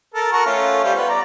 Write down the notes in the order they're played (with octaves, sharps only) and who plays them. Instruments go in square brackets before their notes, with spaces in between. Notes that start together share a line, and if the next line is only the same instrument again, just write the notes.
[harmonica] A4 A#4
F#4 A#4 C#6
A3 C#4 F4
G3 F4 C5
B3
D5 A#5